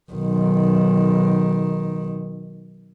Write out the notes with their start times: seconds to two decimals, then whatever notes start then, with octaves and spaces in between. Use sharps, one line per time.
0.12 B1 D#3